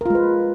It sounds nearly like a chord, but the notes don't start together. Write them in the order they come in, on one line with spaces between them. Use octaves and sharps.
A#4 F4 G#3 B4